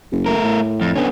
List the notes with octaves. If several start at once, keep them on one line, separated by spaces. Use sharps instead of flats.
F#1
A3 A#4
A2
F2
D3 B3 C#4